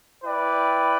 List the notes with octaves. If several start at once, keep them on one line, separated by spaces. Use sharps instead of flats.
E4 B4 D5 G5